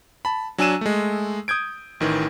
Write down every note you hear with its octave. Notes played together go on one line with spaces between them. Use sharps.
A5 B5
F#3 D4 G#5 E6 D#7 E7
G#3 A3
D#6 G6 G#6 D7
A1 D#3 E3